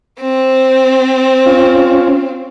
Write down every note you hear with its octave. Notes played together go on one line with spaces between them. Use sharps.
C4
C#4 F4